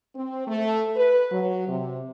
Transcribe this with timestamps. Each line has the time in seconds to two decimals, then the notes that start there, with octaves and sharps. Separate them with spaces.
0.15 C4
0.47 A3
0.96 B4
1.32 F#3
1.67 C3